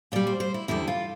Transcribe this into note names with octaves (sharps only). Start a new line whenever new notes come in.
A#2 G3 D5
C5
C5
E4
E2 D3 G3 E4
F4